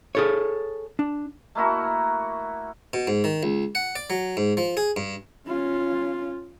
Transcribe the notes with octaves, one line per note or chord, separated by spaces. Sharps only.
G#4 A4 C#5
D4
A3 A#3 E4 F#4
B2
G#2
D#3
C#2
F#5
D5
F#3
G#2
F3
G#4
G2
C#4 F4